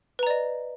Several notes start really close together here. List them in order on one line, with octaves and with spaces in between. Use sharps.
B4 A#5 D5 D#5